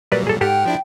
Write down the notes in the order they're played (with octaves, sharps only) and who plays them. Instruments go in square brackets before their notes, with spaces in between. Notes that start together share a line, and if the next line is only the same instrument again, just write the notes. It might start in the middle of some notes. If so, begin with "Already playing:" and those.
[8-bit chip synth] A#2 F#3 G3 [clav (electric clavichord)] A#4 B4 D5
[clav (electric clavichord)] G#4 A4
[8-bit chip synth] G#2 F#5 F6 [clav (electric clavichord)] G4 A4 [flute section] G5
[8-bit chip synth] F3 D4 E4